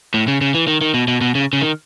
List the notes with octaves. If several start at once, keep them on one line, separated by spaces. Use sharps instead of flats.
A2
C#3
C#3
E3
D#3
D#3
B2
B2
B2
C#3
C#3
D#3